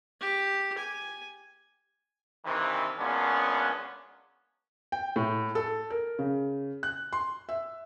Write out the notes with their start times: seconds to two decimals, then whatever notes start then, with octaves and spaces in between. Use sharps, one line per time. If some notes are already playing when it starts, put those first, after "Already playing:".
0.20 G4
0.77 G#5
2.45 G2 C3 D#3 E3
2.99 F#2 A#2 G#3 B3 C#4 D4
4.92 G5
5.16 A2
5.55 A4
5.90 A#4
6.19 C#3
6.83 F#6
7.13 C6
7.49 E5